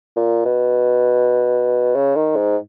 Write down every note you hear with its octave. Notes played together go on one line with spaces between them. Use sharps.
A#2
B2
C#3
D#3
G#2